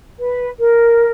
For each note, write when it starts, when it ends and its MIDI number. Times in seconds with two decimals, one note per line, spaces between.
0.19 0.48 71
0.59 1.11 70